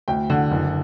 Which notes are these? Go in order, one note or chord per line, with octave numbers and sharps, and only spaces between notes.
D2 G5
D3 F#5
F#1